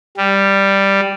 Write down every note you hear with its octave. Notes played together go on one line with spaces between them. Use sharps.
G3